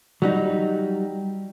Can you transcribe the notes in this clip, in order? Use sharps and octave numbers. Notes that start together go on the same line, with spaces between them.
F#3 G3 D#4